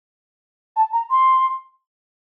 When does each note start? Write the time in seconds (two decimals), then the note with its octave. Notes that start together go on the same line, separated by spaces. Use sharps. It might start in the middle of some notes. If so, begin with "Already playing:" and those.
0.76 A5
0.93 A#5
1.10 C6